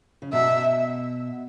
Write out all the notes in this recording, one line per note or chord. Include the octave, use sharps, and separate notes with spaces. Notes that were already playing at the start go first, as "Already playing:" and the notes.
C#3
B2 E5